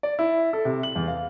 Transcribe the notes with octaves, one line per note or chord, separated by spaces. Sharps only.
D5
E4
A4
C3
F#7
E2
F5